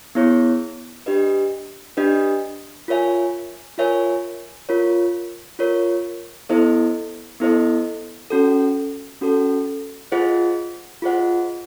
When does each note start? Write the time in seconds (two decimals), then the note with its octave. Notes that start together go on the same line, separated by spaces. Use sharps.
0.15 B3 E4 G#4 C#5
1.06 D4 G4 B4 D#5
1.97 D4 G4 B4 D#5
2.88 F4 A#4 C#5 E5 G#5
3.78 F4 A#4 C#5 E5 G#5
4.69 F4 A#4 C#5
5.59 F4 A#4 C#5
6.49 B3 E4 A4 C5 D#5
7.40 B3 E4 A4 C5 D#5
8.30 C#4 F#4 A4
9.21 C#4 F#4 A4
10.12 F4 G#4 C5 D#5 F#5
11.02 F4 G#4 C5 D#5 F#5